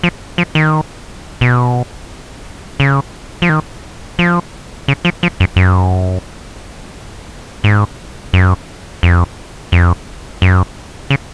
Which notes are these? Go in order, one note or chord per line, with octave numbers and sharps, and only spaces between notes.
F3
F3
D#3
B2
C#3
F3
D#3
F3
C#3
F3
F3
F#2
F#2
G#2
F#2
F2
F2
F#2
C#3